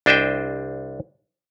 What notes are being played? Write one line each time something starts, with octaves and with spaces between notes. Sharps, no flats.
C2 D4 C5 D#5 E5 G5